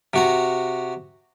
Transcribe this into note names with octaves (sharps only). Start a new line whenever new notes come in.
C3 F#4 A#5